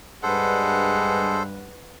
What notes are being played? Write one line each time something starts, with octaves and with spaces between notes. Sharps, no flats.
G2 G#3 A4 B4 C5 F#5